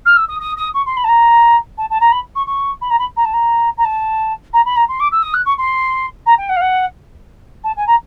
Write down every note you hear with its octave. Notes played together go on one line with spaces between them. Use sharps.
F6
E6
D#6
D#6
D#6
C#6
C6
B5
A5
A#5
A5
A5
A#5
B5
C#6
C#6
B5
A#5
B5
A#5
A5
A#5
A#5
A5
A#5
B5
A#5
C6
D6
E6
D#6
F#6
C#6
C6
A#5
G5
F#5
F5
F#5
A5
G#5
A#5